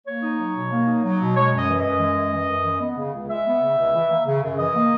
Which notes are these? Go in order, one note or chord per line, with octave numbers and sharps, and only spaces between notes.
A#3 C#5
D#4
F#3
B2
A#3
D#4
F#3
B2
G#3 C#5
F#2
D#5
E3
D#5
F#2
G#3
F#2
E3
F#2
G#3
B3
C#3
C#2
G#3 E5
B3
C#3
C#2
E3
A#3
C#3
F#2
E3 D#5
A#3